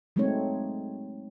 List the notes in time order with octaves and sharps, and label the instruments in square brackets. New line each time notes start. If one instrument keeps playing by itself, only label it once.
[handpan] F#3 G#3 A3 C4 D#4 C#5